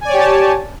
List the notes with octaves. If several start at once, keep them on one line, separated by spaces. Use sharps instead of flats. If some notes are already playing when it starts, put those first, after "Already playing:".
G4 C#5 D5 G#5 A5